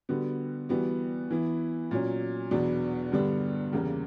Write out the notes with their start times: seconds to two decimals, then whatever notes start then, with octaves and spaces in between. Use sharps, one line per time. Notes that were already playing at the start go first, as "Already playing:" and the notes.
0.09 D3 G3 B3 F#4
0.69 E3 G3 B3 F#4
1.31 E3 B3 E4
1.91 A#2 F#3 C#4
2.51 E2 B2 F#3 B3 D4
3.12 G2 D3 G3 B3 D4
3.73 E2 C#3 G3 A#3